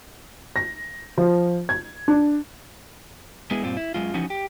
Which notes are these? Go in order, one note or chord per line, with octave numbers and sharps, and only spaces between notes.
A#6
F3
G#6
D4
G#3 B3 E4 G#4
G2 A#2 C4 F4
E4
F#2 D#3 G#3 F4
E3 F3 C#4 D#4 F#4
G4